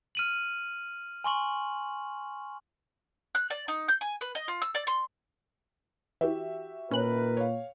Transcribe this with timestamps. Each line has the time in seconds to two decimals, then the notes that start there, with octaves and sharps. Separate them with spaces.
0.15 F6 D#7 F#7
1.24 G#5 C6 C#6 F#7
3.35 F#6
3.50 D5
3.68 D#4
3.88 G6
4.01 G#5
4.21 B4
4.35 D#5
4.48 F4
4.62 E6
4.75 D5
4.87 C6
6.21 E3 F#4 G4 E5
6.91 A#2 D#3 C#4 A#4 B4 F#6
7.37 C#5 F5